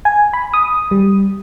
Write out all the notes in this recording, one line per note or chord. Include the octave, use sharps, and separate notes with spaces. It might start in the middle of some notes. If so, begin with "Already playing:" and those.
G#5
B5
D#6
G3